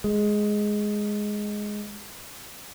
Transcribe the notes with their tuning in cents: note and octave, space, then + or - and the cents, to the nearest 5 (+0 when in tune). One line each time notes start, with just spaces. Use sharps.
G#3 +5